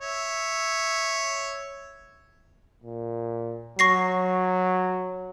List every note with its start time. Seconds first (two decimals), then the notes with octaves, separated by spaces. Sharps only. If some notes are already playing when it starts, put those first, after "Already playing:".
0.01 C#5 E5
2.84 A#2
3.79 F#3 C#6 A#6 C7